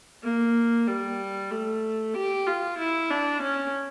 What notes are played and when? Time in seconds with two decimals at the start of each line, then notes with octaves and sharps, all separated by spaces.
0.23 A#3
0.87 G3
1.51 A3
2.14 G4
2.47 F4
2.78 E4
3.10 D4
3.42 C#4